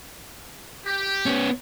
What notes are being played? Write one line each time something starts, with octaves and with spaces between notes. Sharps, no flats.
G4
B3 C#4